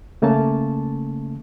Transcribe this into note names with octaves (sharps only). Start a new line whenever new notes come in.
C#3 A3 A#3 C#4 A5